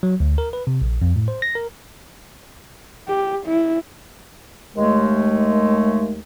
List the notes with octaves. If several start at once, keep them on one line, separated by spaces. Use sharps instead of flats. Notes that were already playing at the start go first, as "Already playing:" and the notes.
F#3
D2
A#4
B4
C3
A#1
F2
A2
C5
A#6
A#4
G4
E4
D#2 G#3 A3